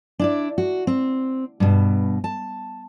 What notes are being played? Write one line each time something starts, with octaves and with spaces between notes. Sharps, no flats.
D4 E4 D5
F#4
C4
G2 B2
A5